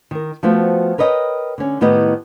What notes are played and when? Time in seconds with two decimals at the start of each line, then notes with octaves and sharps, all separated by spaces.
0.11 D#3 A#4
0.43 F3 A3 B3 F#4 C5 G5
0.98 A#4 B4 C#5 D#5 F#5 G5
1.58 D3 C#4
1.81 A2 D#3 B3 G4 B4 D#5